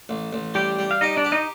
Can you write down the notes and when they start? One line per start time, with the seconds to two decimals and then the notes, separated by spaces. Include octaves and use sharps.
0.09 A1
0.33 A1
0.55 G3 G4 G5
0.79 G3
0.91 F5
1.01 D#4 G4 D#5
1.17 D4 D5
1.25 G4
1.32 D#4 D#5